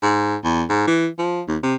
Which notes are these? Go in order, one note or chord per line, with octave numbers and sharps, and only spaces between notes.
G#2
E2
G#2
E3
F3
D#2
C3